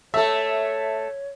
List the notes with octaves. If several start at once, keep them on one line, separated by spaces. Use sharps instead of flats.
A3 A4 C#5 E5